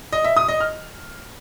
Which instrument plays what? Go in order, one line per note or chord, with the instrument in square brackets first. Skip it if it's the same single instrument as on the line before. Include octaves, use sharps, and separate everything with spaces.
[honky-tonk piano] D#5
E5
D#6
D#5
F6